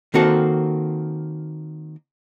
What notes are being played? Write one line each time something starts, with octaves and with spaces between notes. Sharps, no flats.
D#3 A#3 C4 F#4 A4